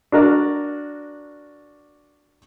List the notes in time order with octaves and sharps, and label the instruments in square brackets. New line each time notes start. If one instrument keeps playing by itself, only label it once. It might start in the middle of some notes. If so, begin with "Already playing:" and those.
[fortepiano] D4 F#4 A#4 D5